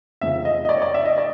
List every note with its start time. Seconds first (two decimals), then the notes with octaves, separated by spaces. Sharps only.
0.21 F1 E2 C#3 F3 E5
0.45 D#5
0.65 D#5
0.69 D5
0.77 C#5
0.82 D5
0.94 E5
1.05 D#5
1.18 D5